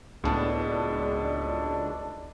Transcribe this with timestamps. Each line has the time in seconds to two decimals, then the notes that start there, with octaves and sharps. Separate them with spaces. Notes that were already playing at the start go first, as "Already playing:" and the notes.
0.24 F#1 C#2 A2 G#3 B3 D4 A4 A5